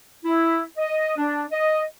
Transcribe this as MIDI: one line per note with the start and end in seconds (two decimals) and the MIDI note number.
0.24 0.62 64
0.78 1.13 75
1.17 1.44 62
1.52 1.82 75